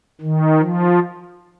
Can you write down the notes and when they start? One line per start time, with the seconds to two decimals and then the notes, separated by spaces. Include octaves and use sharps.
0.21 D#3
0.59 F3